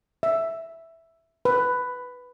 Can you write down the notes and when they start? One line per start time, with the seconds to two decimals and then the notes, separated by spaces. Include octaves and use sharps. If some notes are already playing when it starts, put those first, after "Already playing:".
0.23 E5
1.45 B4